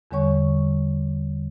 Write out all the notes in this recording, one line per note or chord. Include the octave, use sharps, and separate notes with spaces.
E2 D3 G3 C#5 C#6